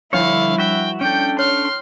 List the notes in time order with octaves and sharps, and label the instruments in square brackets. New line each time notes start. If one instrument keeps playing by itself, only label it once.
[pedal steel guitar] D3 C#5 [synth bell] F3 G3 D4 [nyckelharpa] E4 [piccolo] F5
[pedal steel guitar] F#4 E5 F#5 [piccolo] G5
[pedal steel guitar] C#4 D4 A4 [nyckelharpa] G5 [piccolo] G6
[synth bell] C#5 [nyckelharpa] C6 [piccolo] F6